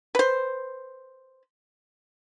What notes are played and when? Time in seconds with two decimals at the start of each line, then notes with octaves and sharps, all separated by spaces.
0.15 B4 C5